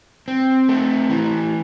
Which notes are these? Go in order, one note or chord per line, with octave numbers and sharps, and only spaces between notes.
C4
A3
E3